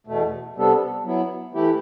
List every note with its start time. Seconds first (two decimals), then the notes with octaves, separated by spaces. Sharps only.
0.07 E2 B2 A3
0.56 C3 G3 B3 D4 A4
1.04 F#3 B3 E4
1.54 E3 A3 E4 G4